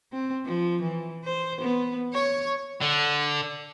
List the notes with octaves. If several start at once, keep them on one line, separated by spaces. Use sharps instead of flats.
C4
F3
E3
C5
B3
C#5
D3